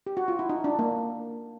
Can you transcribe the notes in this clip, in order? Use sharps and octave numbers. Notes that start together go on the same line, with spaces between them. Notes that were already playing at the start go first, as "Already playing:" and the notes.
G4
F#4
F4
E4
D#4
D4
A#3